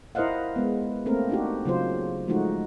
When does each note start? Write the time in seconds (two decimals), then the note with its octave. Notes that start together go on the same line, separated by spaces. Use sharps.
0.15 E4 A#4 C5 D#5 F5 F#5
0.56 G#3 B3
1.06 A3 A#3 C4 A#4
1.29 D4 D#4 F#4 G4
1.65 C#3 F#3 F4 C5
2.28 F3 G#3 A3 D#4 F#4